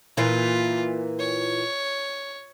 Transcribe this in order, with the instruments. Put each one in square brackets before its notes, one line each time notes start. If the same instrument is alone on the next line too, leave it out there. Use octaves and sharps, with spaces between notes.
[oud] A#2 E3 [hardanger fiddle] F4
[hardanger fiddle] C#5